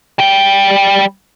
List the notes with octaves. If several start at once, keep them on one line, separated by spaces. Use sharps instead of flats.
G3 G5